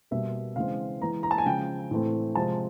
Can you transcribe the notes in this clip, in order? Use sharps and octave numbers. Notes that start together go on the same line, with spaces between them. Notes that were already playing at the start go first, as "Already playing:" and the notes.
B2 G3 A#3 E5
C#3 E3 G#3 C4 F5
E3 G#3 B3 A#5
A#5
A5
G#5
C#3 F3 G#3 G5
A2 E3 A3 C4
C3 F3 G#3 C4 A5